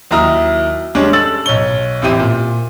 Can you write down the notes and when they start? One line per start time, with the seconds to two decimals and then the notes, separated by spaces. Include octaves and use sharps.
0.11 D#2 F#3 E4 A#5 D#6 F6
0.95 G3 G#3 C#4 D4 G4
1.13 A4 E6 A6 F#7
1.46 B1 C#5 G7
2.02 A1 C4 E4 G4 D#7
2.19 A#2